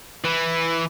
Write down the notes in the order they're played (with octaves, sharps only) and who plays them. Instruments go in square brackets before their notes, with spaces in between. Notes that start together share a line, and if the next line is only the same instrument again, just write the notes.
[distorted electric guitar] E3